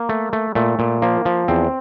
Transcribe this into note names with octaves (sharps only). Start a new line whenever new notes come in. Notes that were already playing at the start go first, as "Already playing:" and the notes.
Already playing: A#3
A3
A3
A#2 A3
A#2
F3 A#3
F3
E2 C4